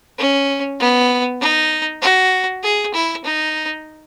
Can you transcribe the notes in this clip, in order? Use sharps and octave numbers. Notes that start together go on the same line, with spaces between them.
C#4
B3
D#4
F#4
G#4
E4
D#4